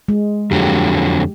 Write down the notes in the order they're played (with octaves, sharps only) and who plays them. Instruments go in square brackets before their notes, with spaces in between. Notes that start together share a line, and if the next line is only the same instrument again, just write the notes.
[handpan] G#3
[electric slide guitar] F2 D3 F#3 [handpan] G4